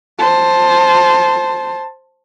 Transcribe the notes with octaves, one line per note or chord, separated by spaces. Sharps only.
C5 A5